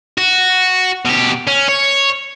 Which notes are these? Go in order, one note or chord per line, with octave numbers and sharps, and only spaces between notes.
F#4
B2 G4
C#4
C#5